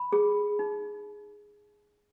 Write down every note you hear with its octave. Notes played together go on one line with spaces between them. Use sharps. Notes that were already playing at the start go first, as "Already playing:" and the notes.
Already playing: B5
G#4
D#4